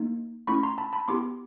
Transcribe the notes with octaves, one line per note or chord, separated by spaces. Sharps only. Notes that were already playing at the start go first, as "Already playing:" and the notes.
Already playing: A#3 D#4
A3 C#4 E4 B5 C#6
A#5 C6
A5 B5
A5 B5
B3 E4 G4 C6 D6